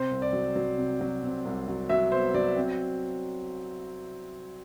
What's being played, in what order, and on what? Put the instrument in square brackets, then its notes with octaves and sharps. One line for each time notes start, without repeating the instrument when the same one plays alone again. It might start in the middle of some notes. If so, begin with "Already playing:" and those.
Already playing: [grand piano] C3 C5
C2
D5
F#3
F#3
C3
F#3
C3
C2
F#3
F#3 E5
B3 C5
F#3 D5
C4